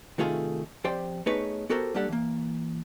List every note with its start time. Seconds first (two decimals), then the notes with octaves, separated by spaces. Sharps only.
0.18 C3 D#3 A3 F4 G#4 A4
0.84 F2 G4 C5 D5 G5
1.26 A3 B3 D#4 G#4 B4 C#5
1.70 B3 F#4 G4 A4 A#4 C5
1.94 G3 A#3 D4 G4 A4 F#5
2.08 E3 A#3